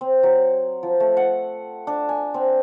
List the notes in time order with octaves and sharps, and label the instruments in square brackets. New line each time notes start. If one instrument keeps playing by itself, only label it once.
[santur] C4
F#3
F3
A3
F#5
D4
G#5
C4